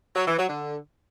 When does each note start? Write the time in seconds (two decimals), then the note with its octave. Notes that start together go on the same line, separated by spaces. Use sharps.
0.16 F#3
0.27 E3
0.38 F#3
0.49 D3